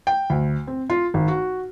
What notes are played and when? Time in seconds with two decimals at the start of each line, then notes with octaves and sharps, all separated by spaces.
0.07 G5
0.30 D2
0.67 C4
0.90 F4
1.14 G#1
1.28 F#4